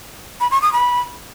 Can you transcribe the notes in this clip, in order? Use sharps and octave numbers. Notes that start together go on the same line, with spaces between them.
B5
C#6
D#6
B5